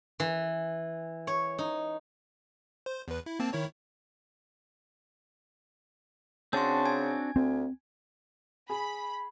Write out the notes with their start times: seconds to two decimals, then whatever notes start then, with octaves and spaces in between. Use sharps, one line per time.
0.20 E3
1.27 C#5
1.58 D#4
2.86 C5
3.08 E2 B4
3.26 E4
3.39 A#3 C4 A5
3.53 D#3 E4 C#5
6.53 C#3 C4 D4 F#4 A5 C6
6.85 G#5 G#6
7.36 D2 C4
8.70 G#4 B5